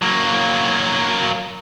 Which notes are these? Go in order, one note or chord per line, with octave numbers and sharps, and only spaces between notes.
F#3 A#3